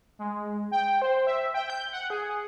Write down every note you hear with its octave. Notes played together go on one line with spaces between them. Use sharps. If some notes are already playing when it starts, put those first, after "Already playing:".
G#3
G5
C5
E5
G5
G6
F#5
G#4